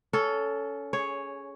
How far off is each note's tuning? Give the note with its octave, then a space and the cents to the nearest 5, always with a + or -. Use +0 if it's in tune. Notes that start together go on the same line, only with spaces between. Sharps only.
C#4 +20 A4 +0
G#4 +0 C#5 +0